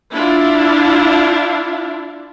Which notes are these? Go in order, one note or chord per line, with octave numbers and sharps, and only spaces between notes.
D4 E4 F4